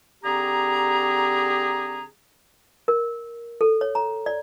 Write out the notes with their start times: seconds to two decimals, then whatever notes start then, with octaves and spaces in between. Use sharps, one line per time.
0.24 D3 C4 G4 G#4 A#5
2.88 A#4
3.61 A4
3.81 C#5
3.95 A#5
4.26 D5